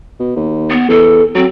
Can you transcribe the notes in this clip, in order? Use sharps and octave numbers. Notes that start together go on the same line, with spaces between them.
B2
D#2
B3
E2 A4
F#3 C4